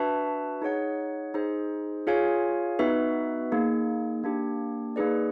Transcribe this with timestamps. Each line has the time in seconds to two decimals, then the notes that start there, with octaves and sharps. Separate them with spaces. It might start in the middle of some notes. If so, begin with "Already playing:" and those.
Already playing: D4 F#4 B4 E5 A5
0.62 D#4 G#4 C#5 F#5
1.34 D#4 G#4 C5
2.07 F4 G#4 C#5 F5 G#5
2.79 B3 D#4 F#4 B4 E5
3.52 A#3 D#4 G#4
4.24 A#3 D4 G4
4.96 A#3 D#4 G#4 B4 D5